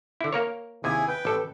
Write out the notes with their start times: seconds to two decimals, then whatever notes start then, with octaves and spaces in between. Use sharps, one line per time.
0.21 D3 E4
0.33 A#3 A#4 C#5
0.84 D#2 C3 E4 G#4 G#5
1.08 B4 G5
1.25 A1 A4